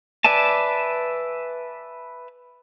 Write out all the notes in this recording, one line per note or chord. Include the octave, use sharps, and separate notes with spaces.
B4 D5 E5 G#5 A5